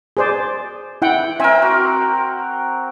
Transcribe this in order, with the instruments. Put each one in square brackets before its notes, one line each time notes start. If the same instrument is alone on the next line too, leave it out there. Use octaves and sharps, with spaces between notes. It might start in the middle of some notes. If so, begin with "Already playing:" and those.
[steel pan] G#4 C5 D5
E4 F#5 G5
[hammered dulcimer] C4 A#4 [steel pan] E5 G#5
[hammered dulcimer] F#4